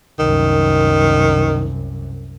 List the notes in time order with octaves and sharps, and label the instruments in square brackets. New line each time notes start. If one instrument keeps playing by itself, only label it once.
[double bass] C2 F#2 [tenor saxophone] D#3